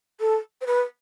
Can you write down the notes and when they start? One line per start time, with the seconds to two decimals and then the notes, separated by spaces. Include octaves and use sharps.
0.20 A4
0.61 C5
0.66 B4